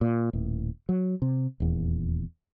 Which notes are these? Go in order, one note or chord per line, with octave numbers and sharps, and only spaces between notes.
A#2
D#1 A2
F#3
C3
D#1 E2